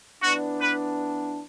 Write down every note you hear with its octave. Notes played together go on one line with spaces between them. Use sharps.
E3 B3 D4 F#4
B4